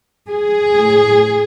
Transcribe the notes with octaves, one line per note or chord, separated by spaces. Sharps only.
G#4
A2